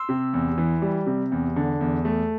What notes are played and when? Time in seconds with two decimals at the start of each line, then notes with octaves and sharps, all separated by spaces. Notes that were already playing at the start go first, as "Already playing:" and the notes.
Already playing: C6 E6
0.09 C3
0.34 E2
0.58 E3
0.82 G3
1.06 C3
1.32 E2
1.56 D3
1.81 E2
2.05 A3